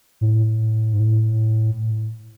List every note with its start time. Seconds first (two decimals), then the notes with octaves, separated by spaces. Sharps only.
0.21 A2
0.93 G#2
1.00 A2